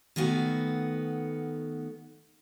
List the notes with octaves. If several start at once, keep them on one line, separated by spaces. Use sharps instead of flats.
D#3 A3 B3 F#4